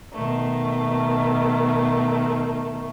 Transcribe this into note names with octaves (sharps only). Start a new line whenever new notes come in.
B2 D#3 A3